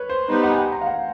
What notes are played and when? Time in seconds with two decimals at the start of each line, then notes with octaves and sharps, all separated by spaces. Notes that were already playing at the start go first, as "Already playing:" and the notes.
Already playing: B4 C#5
0.09 C5
0.29 G3 B3 D#4 G4 B4 C5
0.43 F#5
0.52 G#5
0.58 G5
0.72 A#5
0.81 F5
0.86 F#5